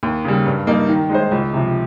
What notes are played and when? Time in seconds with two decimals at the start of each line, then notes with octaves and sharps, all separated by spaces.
0.03 D#2
0.25 C#3 G3
0.46 G2
0.67 G3 A#3 D#4
0.89 D#3
1.09 G#3 D#4 G#4 C5
1.31 C#2
1.53 C3 F3